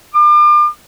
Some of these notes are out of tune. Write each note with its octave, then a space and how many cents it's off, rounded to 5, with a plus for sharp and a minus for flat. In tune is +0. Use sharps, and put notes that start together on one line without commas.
D6 +35